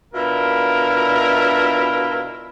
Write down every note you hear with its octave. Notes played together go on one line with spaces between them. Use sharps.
B2 D4 E4 F4 A#4